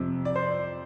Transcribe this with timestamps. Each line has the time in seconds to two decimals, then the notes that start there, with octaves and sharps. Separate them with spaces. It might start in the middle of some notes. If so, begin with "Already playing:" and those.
Already playing: F2 C3
0.25 D5
0.36 C5